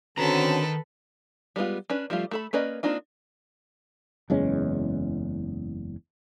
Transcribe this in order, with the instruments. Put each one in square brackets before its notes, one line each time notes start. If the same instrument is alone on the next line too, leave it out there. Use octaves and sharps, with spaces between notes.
[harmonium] D3 [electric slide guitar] D#3 A#5 [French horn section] C4 C#4 F#4 [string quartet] A4 B4
[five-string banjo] G3 G#3 B3 F4
C#4 D4 B4
F3 G3 A3 F4
A3 A4 B5
A#3 C#4 B4 D5 D#5
A#3 C4 D4 D#4 F4
[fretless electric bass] F#1 E2 G#3 C#4